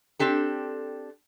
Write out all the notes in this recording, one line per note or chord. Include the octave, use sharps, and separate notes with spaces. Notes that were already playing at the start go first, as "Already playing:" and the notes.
C4 D4 G4 A4